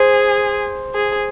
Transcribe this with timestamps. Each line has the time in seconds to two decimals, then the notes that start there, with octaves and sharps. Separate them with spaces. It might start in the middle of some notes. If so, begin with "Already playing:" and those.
Already playing: G#4 C5
0.95 G#4